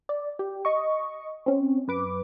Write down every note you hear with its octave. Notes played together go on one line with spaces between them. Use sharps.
D5
G4
D#5 C#6
C4 C#4
F#2 B4 D6